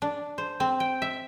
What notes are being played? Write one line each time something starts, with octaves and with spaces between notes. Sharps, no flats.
D4
C5
C4
G5
E5